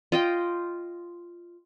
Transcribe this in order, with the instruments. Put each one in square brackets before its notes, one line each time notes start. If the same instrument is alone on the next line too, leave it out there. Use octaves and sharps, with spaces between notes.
[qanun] F4 D#5 G5